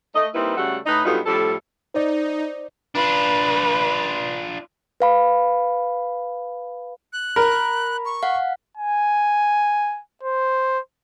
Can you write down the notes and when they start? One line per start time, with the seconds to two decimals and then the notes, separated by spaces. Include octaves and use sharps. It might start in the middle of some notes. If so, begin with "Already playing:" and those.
0.15 A3 D#5
0.35 G3 A#3 C4 D#4 E4 B4
0.57 C#3 G3 A3 F#4 A4 F#5
0.86 A2 D#4 B4 D#5
1.05 G2 F#3 B3 D#4 F4 A4
1.25 A2 F3 G3 D4 A4
1.94 D#4 C5 D5
2.95 D4 F4 B4
5.00 B4 F5 B5
7.13 F#6
7.36 A#4 B5
8.05 C#6
8.23 F5 F#5
8.77 G#5
10.23 C5